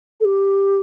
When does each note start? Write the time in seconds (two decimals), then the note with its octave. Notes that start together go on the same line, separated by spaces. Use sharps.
0.20 A4
0.24 G4